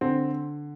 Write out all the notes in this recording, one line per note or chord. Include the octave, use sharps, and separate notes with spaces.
D3 C4